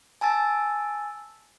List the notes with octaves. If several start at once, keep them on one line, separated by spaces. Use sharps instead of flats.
G#5 A5 E6 A6